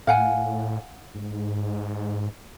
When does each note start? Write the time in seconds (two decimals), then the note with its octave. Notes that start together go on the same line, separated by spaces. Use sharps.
0.07 A2 F5 F#5 G#5
1.15 G#2